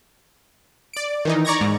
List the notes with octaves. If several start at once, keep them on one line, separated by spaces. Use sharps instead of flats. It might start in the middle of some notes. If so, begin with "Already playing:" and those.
D5 D7
D#3 E3 D#4
D5 A#5 C#6 G#6 A#6
G#2